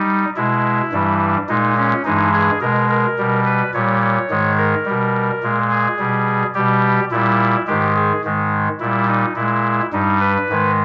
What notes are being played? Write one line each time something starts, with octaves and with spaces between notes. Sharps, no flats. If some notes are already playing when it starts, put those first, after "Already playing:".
Already playing: G3 D#4
B2 G#3 E4
G2 E3 G3
A#2 G#3 D#4
C#4
G2 E3 G#3 D#4
G#4
B2 G#3 A#4
A#4
B2 G3
B4
A#2 G3 C#5
C#5
G#2 D#3 G#3
A#4
B2 G3
A#2 G#3
G#4
B2 G3
B2 G3 G4
A#2 G3 E4
G#2 D#3 G#3 G4
G#4
G#2 D#3 G#3
A#2 G3 E4
D#4
A#2 G#3 E4
G2 G3 D#4
B4
G#2 D#3 G#3